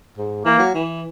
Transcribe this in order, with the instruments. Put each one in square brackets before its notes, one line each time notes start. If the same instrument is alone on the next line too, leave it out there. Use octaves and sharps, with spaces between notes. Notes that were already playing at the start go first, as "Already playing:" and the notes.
[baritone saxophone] G#2
[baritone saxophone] E3 [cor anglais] A#3
[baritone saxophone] F#3
E3